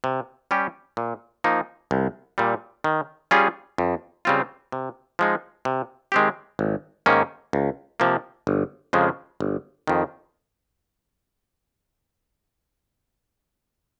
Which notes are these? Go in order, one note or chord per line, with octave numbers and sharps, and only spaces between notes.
C3
G3 C#4 G4
A#2
F3 A#3 D#4
C2
A#2 G3
D#3
G3 C#4 F4 G#4
F2
C#3 G3 C4 F4
C3
F3 G#3 D#4
C3
D#3 G#3 C4 G4
G#1
G#2 D#3 A#3 C#4
C#2
C3 F3 A#3
G1
F2 C#3 F3 G#3
G1
F2 D#3